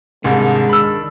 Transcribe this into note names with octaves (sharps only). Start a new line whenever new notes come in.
C2 G#2 D#3 G#3 D4
B5 E6